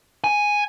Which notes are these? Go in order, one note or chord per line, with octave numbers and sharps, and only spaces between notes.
G#5